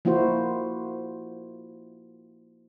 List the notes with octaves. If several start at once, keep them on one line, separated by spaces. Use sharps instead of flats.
F3 A#3 E4 F#4 C5